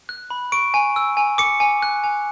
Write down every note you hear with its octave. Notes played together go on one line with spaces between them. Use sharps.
F#6
B5
C#6 D7
G#5
E6
G#5
D6 C#7
G#5
F#6
G#5